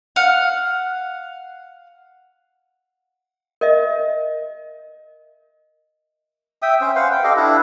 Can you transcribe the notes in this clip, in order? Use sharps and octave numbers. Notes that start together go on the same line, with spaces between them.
F5 F#5
A#4 D#5 E5
E5 G5 D#6
C#4 C5
B4 C5 F5 F#5
G5
G4 A4 D#5 F5
D4 E4 A4 B4